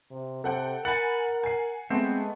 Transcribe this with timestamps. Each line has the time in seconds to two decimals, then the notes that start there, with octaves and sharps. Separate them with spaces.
0.11 C3
0.44 C3 A4 F#5 G5
0.85 A#4 F#5 G#5 B5 A6
1.43 G#5 C7
1.90 G#3 A3 B3 C4